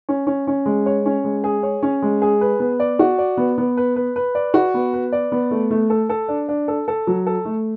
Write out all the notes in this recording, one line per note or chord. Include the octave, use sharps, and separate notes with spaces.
C#4
C#4
C#4
G#3
C#5
C#4
G#3
G#4
C#5
C#4
G#3
G#4
B4
B3
D5
F#4
D5
B3
B3
B4
B4
B4
D5
F#4
B3
B4
D5
B3
A3
A3
A4
A4
D4
D4
A4
A4
F#3
A4
A3